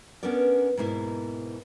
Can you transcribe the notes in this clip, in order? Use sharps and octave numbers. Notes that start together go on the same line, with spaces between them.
B3 C#4 D4 A#4 D5
G#2 B2 A#3 E4